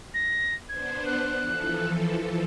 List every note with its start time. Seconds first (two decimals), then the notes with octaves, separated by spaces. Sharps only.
0.14 A#6
0.69 B3 D4 C5 G#6
1.06 F#6
1.39 E3 F3 A4